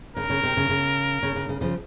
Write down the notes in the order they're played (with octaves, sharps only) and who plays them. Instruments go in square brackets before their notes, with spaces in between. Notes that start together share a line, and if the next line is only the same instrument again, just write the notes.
[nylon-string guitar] C#3 [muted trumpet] A#4
[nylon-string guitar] C#3
C3
C#3
C#3
C#3
C#3
C#3
C#3 F3